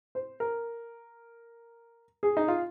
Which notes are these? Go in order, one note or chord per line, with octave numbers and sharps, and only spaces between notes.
C5
A#4
G#4
D#4
F4